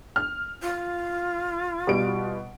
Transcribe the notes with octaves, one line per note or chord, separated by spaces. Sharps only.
F6
F4
B2 G3 D7